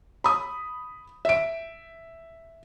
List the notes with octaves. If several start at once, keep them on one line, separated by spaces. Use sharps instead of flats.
B5 D#6
E5 D7